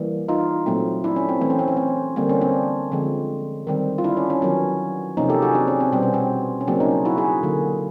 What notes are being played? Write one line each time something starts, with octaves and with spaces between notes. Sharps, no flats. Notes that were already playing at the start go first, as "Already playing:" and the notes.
Already playing: E3 G3 A#3
D#4 F4
A#2 F#3 A3 C4
D4 E4
C#4
C4
E3 A3 C4
C#4
C4
C#4
C4
D3 G3 A#3 C4
C#4
C4 D4
D3 F3 G#3 C4
D#3 G3 C4
F4
D4 E4
C#4
C#4
D#3 F#3 B3 C#4
C3 F3 A#3 C#4 D#4
G4 A4
F#4 G#4
C4 D4
C#4
C4
B2 G3 B3 C4
C#4
C4
C#4
C#3 F#3 A#3 C4 D4
C#4 D#4
E4 F#4
F#4 G#4
D3 F#3 A#3